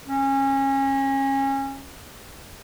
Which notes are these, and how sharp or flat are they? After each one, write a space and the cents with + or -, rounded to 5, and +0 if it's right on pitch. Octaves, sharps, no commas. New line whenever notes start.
C#4 -25